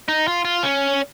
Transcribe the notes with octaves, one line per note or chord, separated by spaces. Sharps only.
D#4
F4
F4
C#4